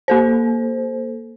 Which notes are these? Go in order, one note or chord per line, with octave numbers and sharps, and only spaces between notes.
A#3 A4 C5